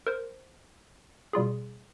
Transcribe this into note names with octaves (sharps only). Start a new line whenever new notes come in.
A#4 C5
B2 G3 F4 G#4